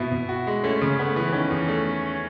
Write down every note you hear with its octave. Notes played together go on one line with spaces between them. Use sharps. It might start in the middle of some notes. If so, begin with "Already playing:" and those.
Already playing: B2 E4
B2
F#4
G#3
A3 C#4
C#3
A3 B3
E3
D#3 C#4
E2
A3